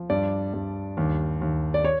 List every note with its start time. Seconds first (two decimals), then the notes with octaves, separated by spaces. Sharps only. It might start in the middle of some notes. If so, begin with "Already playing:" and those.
Already playing: F3
0.10 G2 D5
0.54 G2
0.97 D#2
1.41 D#2
1.74 D5
1.84 C#5